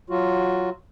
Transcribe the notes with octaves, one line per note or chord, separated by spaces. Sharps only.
F#3 F4 F#4